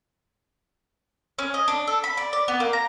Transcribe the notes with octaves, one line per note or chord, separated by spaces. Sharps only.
C#4
D#5
D4
A4
B5
D5
D5
B3
A#3
A#5